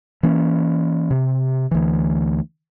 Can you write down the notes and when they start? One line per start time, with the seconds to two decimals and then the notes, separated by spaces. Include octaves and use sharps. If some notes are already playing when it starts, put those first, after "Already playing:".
0.23 E3 A#3 C#4
1.11 C3
1.71 D2 E3